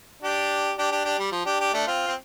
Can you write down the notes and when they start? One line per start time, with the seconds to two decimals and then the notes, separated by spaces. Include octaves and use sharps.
0.23 D4 G4
0.78 D4 G4
0.92 D4 G4
1.05 D4 G4
1.19 G3
1.32 F3
1.46 D4 G4
1.60 D4 G4
1.73 A3 D4
1.87 C4 F4
2.07 C4